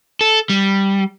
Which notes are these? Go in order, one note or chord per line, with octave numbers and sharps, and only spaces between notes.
A4
G3